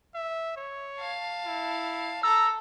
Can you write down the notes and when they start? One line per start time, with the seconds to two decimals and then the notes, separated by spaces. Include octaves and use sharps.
0.14 E5
0.57 C#5
0.99 F5 A5
1.46 E4
2.23 A4 A#5 E6